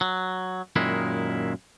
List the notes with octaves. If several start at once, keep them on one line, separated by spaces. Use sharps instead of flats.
F#3
F#2 A#2 D#3 G#3 E4